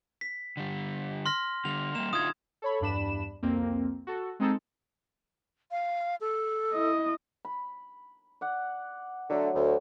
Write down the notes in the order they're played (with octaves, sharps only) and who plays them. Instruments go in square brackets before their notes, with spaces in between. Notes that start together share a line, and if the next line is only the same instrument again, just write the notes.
[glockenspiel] B6
[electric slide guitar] D3 G3
[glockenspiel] C6 F6 A#6
[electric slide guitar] D3 G3 [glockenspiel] F7
[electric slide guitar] G3 A#3 [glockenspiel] E7
[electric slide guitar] D3 D#4 F4 [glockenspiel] D#6 G#6
[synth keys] A4 C#5 B5
E2 G2 D4 B5 E7
C2 F2 A#3 C4
F#4 A4
G#3 C4 D#4 G#4 A4
[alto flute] F5
A4
[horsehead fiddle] E4 D#5
[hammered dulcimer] B5
D5 F#5
[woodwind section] D3 A3 [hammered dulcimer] F#3
[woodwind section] D2